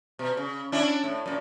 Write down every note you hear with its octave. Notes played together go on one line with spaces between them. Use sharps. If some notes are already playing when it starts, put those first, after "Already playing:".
B2
C#3
C#4 D4 E4
A2
F#2 A#2